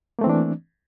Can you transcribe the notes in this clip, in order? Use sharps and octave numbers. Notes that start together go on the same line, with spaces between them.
E3 A3 A#3 C4 D4